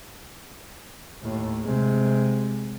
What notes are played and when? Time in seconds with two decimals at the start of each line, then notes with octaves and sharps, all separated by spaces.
1.22 D#2 A2
1.63 C3 G#3